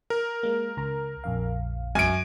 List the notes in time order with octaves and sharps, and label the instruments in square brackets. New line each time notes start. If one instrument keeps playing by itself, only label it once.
[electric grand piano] A#4
[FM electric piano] G#3 A#3
C#2 A#5
A#1 F2 F5
[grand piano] F#2 D7 [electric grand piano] G#5